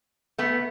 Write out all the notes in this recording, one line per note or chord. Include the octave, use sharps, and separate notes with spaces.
A3 B3